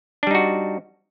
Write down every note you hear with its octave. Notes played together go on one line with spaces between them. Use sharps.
G3 D4 D#4 F#4